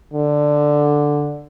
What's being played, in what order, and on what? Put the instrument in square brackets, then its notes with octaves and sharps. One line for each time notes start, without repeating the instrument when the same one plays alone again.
[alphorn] D3